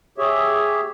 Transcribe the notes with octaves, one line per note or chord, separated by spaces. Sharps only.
G4 G#4 C#5 E5